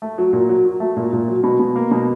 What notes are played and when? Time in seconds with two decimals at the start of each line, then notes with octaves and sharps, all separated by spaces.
0.02 A3
0.18 F#3
0.33 A#2
0.49 F#3
0.65 F#3
0.80 A3
0.97 A#2
1.13 A#2
1.28 F#3
1.43 B2
1.59 B2
1.76 A#3
1.91 B2